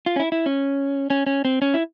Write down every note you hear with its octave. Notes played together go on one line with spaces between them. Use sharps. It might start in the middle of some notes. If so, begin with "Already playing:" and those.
F4
C#4
E4
E4
C#4
C#4
C#4
C4
C#4
E4